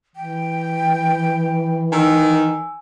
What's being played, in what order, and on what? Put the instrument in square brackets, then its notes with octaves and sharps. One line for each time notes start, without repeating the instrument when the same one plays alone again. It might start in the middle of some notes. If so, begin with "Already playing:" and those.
[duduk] E3 [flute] G5
[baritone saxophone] D#3 [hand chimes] G#5 E6